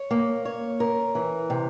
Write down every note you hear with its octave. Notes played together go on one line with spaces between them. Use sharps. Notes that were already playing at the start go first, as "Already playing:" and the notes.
Already playing: C#5
A#3
C#5
A#4
E3
C3